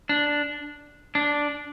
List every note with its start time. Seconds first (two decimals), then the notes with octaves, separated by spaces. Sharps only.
0.09 D4
1.15 D4